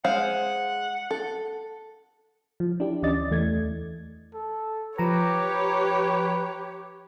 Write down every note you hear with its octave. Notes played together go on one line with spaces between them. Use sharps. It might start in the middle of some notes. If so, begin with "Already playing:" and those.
G#3 C5 F5 F#5
A4
F3
D4 E4 G4
D2 E3 C#4 D5 D#5 A6
E2 E3 A3 G#6
A4
F3 G4 B4 C#5 A#5